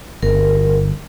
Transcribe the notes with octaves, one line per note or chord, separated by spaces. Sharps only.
G1 A#4